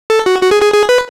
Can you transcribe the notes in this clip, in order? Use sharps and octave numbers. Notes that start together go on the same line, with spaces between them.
A4
F#4
F#4
G#4
G#4
G#4
B4